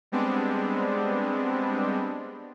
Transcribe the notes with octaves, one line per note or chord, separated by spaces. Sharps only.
G3 G#3 B3 C4 D4